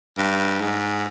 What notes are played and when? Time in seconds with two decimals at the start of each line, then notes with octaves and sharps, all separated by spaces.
0.18 G2
0.61 G#2